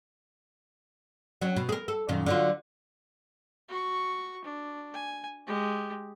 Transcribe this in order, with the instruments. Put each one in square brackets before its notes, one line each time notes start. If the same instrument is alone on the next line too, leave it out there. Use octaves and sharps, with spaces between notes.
[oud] F#3 C#4
B2
G#4 A#4
A4
F#2 A#2 D#3
D3 F#3 F4
[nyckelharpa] F#4 C#6
D4
G#5
G#3 G4